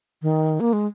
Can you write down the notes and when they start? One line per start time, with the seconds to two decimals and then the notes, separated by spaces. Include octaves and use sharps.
0.22 D#3
0.60 A#3
0.73 G#3